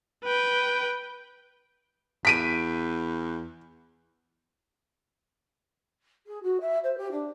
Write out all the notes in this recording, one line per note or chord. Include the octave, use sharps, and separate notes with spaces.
B4 G5
E2 B6 D7 D#7
G#4
F#4
E5
C5
G4
D4